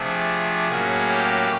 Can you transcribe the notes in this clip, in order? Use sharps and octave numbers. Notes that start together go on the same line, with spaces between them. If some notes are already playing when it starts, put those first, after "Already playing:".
Already playing: C3 F3 A3 D4 G#4
A2 F#3 A#3 C#4
G4